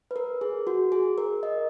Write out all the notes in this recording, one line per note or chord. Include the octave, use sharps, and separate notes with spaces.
B4
A#4
G#4
F#4
G#4
A#4
D#5